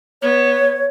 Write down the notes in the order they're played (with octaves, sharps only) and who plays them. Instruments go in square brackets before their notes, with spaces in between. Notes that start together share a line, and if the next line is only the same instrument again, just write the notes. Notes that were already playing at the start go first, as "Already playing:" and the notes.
[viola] B3 [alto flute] C#5